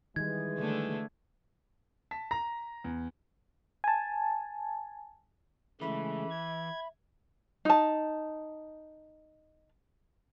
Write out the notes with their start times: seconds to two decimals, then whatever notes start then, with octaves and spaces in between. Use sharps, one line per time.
0.16 D#3 E3 G3 G#3 G#6
0.59 D3 A3
2.11 A5 B6
2.31 A#5 A#6
2.84 E2
3.84 G#5 A5
5.81 C#3 E3 G#3 A3 E5 B5
6.30 G#6
7.65 D#4 A5